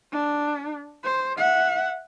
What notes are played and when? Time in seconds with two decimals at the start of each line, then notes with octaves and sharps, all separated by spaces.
0.12 D4
1.04 C5
1.38 E5 F#5